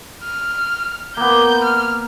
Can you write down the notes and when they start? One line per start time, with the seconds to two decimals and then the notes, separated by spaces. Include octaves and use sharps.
0.24 F6
1.17 A#3 B3 G6
1.64 F6